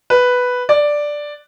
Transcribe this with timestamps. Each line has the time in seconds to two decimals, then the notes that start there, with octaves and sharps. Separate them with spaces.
0.10 B4
0.69 D5